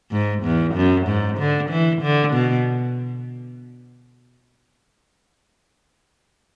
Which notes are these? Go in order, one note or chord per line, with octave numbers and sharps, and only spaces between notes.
G#2
E2
F#2
G#2
D3
E3
D3
B2